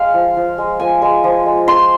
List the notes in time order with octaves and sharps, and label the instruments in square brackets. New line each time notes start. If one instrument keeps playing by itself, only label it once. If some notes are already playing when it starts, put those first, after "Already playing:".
Already playing: [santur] G#3 F5
F3
F3
G#3
F3 G#5
G#3
F3
G#3
F3 C6